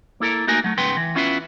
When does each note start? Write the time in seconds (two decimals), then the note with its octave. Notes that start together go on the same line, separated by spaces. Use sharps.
0.20 A#3 E4 A4 A#4
0.47 A3 A#3 D#4 F#4 A#4 G#5
0.64 F#3 A3
0.78 G#2 C#3 B3 B4 G5 C6
0.97 E3
1.15 B3 C#4 E4 F4 G4 B4